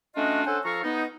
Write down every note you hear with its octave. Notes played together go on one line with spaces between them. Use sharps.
A3 C#4 D4 F4 F#4 D#5
C#4 D4 A4 C5 F#5 G#5
F3 A4 F5 A#5 C#6
B3 D#4